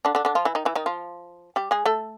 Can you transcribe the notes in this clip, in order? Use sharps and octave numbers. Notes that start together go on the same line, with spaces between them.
D3 D4
D3 D4
D3 D4
F3 F4
E3 E4
D#3 D#4
E3 E4
D#3 D#4
F3 F4
G3 G4
G#3 G#4
A3 A4